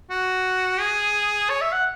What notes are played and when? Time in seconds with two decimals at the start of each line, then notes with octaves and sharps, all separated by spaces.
0.10 F#4
0.80 G#4
1.50 C#5
1.61 E5
1.73 F#5